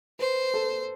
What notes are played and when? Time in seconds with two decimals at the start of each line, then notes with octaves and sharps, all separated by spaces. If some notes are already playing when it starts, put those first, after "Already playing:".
0.19 B4 C5
0.54 A4